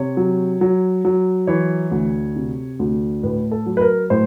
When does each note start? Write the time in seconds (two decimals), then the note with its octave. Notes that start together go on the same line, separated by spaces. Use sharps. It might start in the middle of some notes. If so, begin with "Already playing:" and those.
Already playing: C3 C#5
0.17 F#3
0.61 F#3
1.05 F#3
1.47 E3 C#5
1.91 D2
2.36 C3
2.79 D2
3.23 A2 B4
3.52 A4
3.66 F#3
3.77 B4
3.81 A#4
4.10 A2 C5